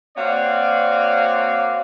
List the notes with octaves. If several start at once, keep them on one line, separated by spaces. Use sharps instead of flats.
A#3 C4 F#4 C#5 D5 F5